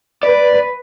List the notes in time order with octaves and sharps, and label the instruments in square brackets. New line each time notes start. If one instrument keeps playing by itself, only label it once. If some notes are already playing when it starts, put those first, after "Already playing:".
[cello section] B4 [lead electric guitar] D5